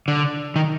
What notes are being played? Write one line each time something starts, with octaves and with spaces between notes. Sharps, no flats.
D3
D#3